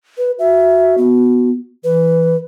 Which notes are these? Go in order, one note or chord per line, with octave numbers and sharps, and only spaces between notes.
B4
F#4 E5
B3
E3 B4